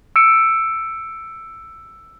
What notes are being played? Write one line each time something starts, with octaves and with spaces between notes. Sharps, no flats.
E6 C#7 D7